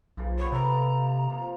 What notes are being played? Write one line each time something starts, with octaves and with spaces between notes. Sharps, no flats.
B1 C#3 F3 A#3
B3 G4 B4 C#5
C3 A4 A#5
D3 A#3 D#5
C3 F3 A#3